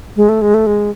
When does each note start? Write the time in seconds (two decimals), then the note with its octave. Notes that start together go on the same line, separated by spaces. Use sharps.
0.16 G#3
0.29 A3
0.42 G#3
0.54 A3
0.67 G#3